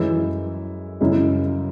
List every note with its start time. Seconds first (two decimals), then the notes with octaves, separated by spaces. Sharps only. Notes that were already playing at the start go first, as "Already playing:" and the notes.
Already playing: F#2 E3 G#3 E4
1.01 F#2 C#3 G#3 E4